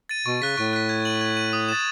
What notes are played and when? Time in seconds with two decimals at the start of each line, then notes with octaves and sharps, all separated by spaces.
0.09 A6 D#7
0.26 B2 C#6
0.41 C#3 F#6 B6
0.57 A2 C#6
0.73 F#6 B6
0.89 G#6
1.05 D#7 F#7
1.21 G#6
1.37 D#7 F#7
1.53 D#6
1.69 A6 E7